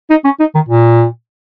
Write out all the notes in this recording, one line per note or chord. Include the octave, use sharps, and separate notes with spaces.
D#4
C#4
D#4
D#3
A#2